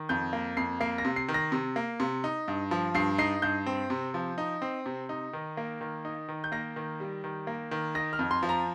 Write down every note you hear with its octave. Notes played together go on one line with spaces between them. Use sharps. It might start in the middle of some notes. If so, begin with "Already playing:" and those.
Already playing: D#3
F2 G6
A#3
F2 C7
A#3 C7
A#6
C3
C7
D#3
A#6
C3
A#3
C3
D#4
G2
F3
G2 C7
D#4 C7
G2 G6
C4
C3
F3
D#4
C4
C3
D#4
D#3
A#3
D#3
D#4
D#3
G6
A#3 A#6
D#3
G3
D#3
A#3
D#3
D#4 A#6
F6
F2
C6
F3
A#5